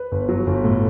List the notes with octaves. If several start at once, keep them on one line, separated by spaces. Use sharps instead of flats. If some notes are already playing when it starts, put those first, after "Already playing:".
Already playing: B4
G1
F#3
G1
A2